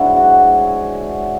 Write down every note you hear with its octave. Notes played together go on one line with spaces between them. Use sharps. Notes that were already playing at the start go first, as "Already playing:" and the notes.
Already playing: G#2 F#3 D4 E4
F#4
G#4